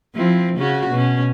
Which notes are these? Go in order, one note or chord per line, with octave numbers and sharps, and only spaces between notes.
F3 C4 E4
C#3 C#4 F#4
B2 C#4